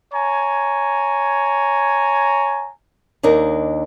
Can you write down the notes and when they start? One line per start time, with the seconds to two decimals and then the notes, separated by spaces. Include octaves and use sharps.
0.14 C#5 G#5 A#5
3.23 D#2 D4 D#4 A#4